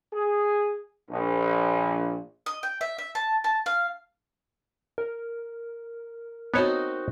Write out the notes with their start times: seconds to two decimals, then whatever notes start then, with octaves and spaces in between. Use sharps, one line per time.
0.12 G#4
1.11 A#1
2.46 D#5
2.63 G5
2.81 E5
2.98 E5
3.15 A5
3.44 A5
3.66 F5
4.98 A#4
6.54 B3 C4 D#4 F#4 C#5 A5